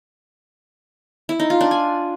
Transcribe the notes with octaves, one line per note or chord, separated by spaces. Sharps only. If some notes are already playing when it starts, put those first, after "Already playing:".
E4
D#4
F4
D4
G#5